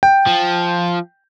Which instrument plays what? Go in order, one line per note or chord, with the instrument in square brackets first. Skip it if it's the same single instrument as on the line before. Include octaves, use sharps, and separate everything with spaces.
[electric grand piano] G5
[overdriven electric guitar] F3